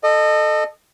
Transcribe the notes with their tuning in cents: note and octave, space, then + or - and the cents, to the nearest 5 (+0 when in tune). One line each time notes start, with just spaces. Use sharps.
A4 +0 D#5 -25